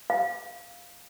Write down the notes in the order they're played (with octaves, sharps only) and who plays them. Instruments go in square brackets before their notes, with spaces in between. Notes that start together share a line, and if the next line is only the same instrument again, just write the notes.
[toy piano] F5